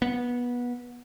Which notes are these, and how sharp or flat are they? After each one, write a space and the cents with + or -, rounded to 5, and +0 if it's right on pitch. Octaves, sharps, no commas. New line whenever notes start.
B3 -20